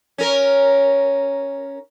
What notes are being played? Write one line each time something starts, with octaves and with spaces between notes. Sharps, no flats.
C#4 A#4